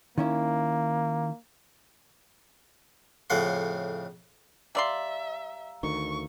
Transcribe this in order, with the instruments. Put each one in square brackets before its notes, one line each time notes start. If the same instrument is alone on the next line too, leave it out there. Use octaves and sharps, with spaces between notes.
[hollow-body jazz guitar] D#3 C#4 E4 [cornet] A#3
[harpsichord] F2 A2 C#3 F#5 C6
[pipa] G3 D5 C6 [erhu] E5 [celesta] F5 A#5 E6
[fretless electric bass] D2 D#3 [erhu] C#6